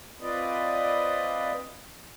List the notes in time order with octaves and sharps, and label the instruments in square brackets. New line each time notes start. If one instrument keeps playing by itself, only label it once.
[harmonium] C4 F4 B4 D5 D#5